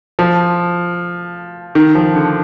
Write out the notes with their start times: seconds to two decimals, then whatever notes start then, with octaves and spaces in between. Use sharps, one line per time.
0.19 F3
1.75 D#3
1.95 F3
2.15 D3